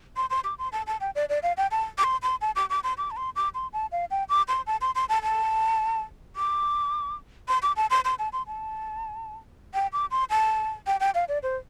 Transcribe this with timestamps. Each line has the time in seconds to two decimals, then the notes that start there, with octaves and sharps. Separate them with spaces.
0.16 C6
0.30 C6
0.44 D6
0.59 C6
0.72 A5
0.87 A5
1.01 G5
1.15 D5
1.29 D5
1.43 F5
1.57 G5
1.71 A5
1.98 D6
2.04 C6
2.23 C6
2.41 A5
2.56 D6
2.70 D6
2.84 C6
2.98 D6
3.11 A5
3.17 C6
3.36 D6
3.54 C6
3.73 A5
3.92 F5
4.11 G5
4.29 D6
4.48 C6
4.67 A5
4.81 C6
4.95 C6
5.09 A5
5.23 A5
6.36 D6
7.48 C6
7.63 D6
7.77 A5
7.90 C6
8.05 C6
8.19 A5
8.33 C6
8.47 A5
9.74 G5
9.93 D6
10.11 C6
10.30 A5
10.87 G5
11.00 G5
11.15 F5
11.28 D5
11.43 C5